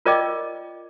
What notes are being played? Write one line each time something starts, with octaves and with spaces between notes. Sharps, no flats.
F4 A#4 D5 D#5 G5 D6